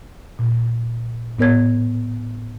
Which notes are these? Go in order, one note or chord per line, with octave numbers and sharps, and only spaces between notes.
A#2
A2 B3 A#4 C#5 G#6